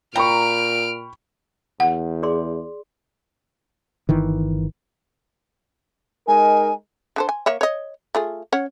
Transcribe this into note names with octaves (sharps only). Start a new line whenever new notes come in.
A#2 G5 A#5 B5 C#6 F6 D7
E2 F#5
G#4 D5 C6
G1 D#3 E3
G#3 D#4 A#4 G#5
D3 A4 C5
G#5
A#3 C#5 E5
C#5 D#5
A3 F4 G#4
C#4 C#5 F#5